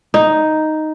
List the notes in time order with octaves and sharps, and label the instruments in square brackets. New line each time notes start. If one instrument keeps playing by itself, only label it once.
[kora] D#4